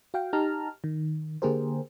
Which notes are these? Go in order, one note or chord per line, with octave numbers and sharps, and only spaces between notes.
F#4 F5 G5
D#4 G4 A5 A#5 F6
D#3
D3 A#3 G4 G#4 A#4 C5